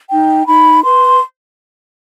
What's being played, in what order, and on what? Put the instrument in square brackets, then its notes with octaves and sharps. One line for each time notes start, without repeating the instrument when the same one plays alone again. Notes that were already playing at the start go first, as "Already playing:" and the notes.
[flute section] D#4 G5
D#4 B5
B4 C6